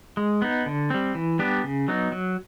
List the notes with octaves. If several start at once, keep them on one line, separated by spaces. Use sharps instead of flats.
G#3
B3 D#4
D3
G3 C4
E3
G3 B3 D4 G4
C#3
F#3 B3 D#4
F#3